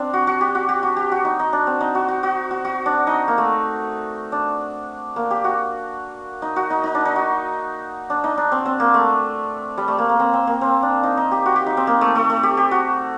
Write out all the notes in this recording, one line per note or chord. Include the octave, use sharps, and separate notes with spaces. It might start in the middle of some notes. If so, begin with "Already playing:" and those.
Already playing: C4 D4
F#4
F#4
G4
F#4
G4
F#4
G4
F#4
D#4
D#4
D4
C4
D#4
F#4
F#4
F#4
F#4
F#4
D4
D#4
A#3
A3
D4
A#3
G4
F#4
D#4
F#4
D#4
D#4
D4
D#4
F#4
D4
D#4
D4
C4
C4
A#3
A3
G3
A3
A#3
A#3
C4
C4
A#3
C4
D4
D#4
D#4
G4
F#4
G4
D#4
C4
A#3
A3
A3
A3
G4
G4
F#4